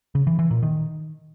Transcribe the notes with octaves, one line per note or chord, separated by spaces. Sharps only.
C#3
E3
E3
A#2
D#3